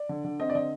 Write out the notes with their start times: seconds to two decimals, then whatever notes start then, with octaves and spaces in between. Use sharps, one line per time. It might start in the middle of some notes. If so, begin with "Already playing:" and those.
Already playing: D5
0.09 D3
0.24 D3
0.40 C4 D#5
0.49 D5
0.55 D3 D#5